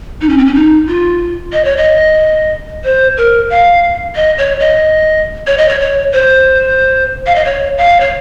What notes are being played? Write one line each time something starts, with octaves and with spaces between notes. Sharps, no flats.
D#4
C#4
C4
C#4
D#4
F4
D#5
C#5
D#5
C5
A#4
F5
D#5
C#5
D#5
C#5
D#5
C#5
C#5
C5
F5
D#5
C#5
F5
C#5